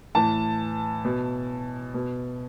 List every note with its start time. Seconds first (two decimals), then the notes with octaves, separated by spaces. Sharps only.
0.15 A2 E3 A5
1.05 B2
1.94 B2